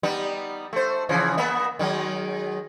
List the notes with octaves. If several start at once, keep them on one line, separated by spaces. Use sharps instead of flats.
G3 B3 D#4
A3 C5
C#3 E3 F3
A#3 B3 E5
D#3 F#3 G#3